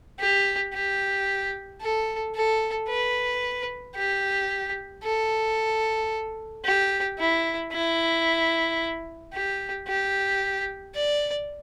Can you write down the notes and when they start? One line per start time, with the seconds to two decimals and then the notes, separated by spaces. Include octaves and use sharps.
0.20 G4
0.74 G4
1.81 A4
2.35 A4
2.88 B4
3.95 G4
5.03 A4
6.65 G4
7.19 E4
7.72 E4
9.33 G4
9.87 G4
10.95 D5